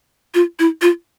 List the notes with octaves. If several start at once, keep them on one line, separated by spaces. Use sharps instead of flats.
F4
E4
F4